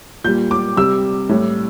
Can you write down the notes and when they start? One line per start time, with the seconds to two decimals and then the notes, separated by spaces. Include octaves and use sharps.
0.24 A#2 G3 G6
0.51 D6
0.77 C3 G3 E6
1.29 A2 G3